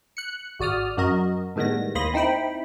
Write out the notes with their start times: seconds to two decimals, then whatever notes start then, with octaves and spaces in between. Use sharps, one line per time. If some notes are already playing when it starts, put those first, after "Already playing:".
0.17 F#6 C#7
0.60 G#1 F#4 D5 D#6 F6
0.97 F#2 F#4 A#4 D#5
1.56 A2 D#3 G3 G#3 B3 A#6
1.95 D#2 A#3 B5 C6 D#6 A#6
2.14 C4 D#4 E4 G5 B5